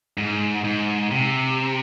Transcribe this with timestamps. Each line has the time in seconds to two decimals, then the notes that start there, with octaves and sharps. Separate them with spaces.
0.18 G#2
0.64 G#2
1.11 C3